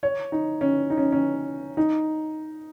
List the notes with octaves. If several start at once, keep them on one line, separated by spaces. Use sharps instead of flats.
C#5
D#4
C#4
D#4
C#4
C#4
D#4